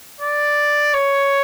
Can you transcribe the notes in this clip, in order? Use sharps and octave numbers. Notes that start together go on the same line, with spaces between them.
D5
C#5